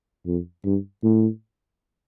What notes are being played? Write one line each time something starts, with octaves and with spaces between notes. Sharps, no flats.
F2
G2
A2